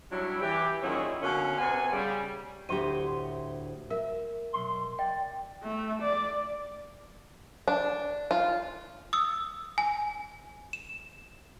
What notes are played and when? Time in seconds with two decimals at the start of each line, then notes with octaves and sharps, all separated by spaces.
0.12 F#3 G3 C#4 D4 E4
0.41 E3 G4
0.83 A#2 D#3 F#3 C#4 E4 G#4
1.22 B2 D3 A#3 C#4
1.59 C3 B3 F#5 G#5
1.92 C#3 G3
2.69 D2 A2 F#4 G4 C5 D#7
3.91 A#4 E5
4.53 B1 C6
4.99 D5 G5
5.63 A3
6.02 D5
7.68 D4
8.31 F4
9.13 D#6 E6
9.78 G#5
10.73 E7